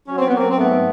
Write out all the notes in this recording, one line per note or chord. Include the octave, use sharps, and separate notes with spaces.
F#3 C#4
C4
B3
F#3 A#3 C4
C4
G#2 A3 B3